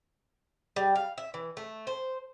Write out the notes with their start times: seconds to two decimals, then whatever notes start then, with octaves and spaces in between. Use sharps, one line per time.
0.76 G3
0.96 F5
1.18 E5
1.34 E3
1.57 A3
1.87 C5